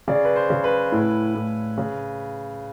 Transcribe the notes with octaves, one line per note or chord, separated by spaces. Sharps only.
C#3 D5
B4
C5
C#3
B4
A2
A2
C#3